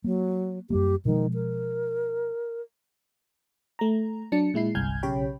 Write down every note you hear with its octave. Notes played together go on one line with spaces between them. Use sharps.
F#3 A#3
F#2 G3 A#3 G4
B2 D#3 F3 G#3
A#4
A3 A#5
F#3 D4 A5 C#7
A#2 G#3 E4 C7
G1 C2 G#5 F6 G6 G#6
B1 C#3 G4 C#5 G5 B5